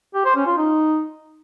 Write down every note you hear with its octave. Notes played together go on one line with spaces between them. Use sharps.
G4
C5
C#4
F4
D#4